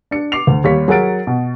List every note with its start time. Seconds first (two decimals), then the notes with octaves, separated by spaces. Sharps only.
0.11 D4 C#7
0.32 D6 C7 F7
0.47 D2
0.64 D#2 G3 C#5 B6
0.88 F#3 G#4 A#4 F#5 A6 D7
1.27 B2